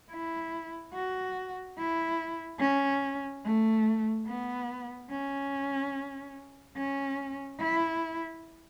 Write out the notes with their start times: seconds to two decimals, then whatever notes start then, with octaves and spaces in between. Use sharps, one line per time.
0.11 E4
0.94 F#4
1.78 E4
2.60 C#4
3.44 A3
4.26 B3
5.10 C#4
6.77 C#4
7.60 E4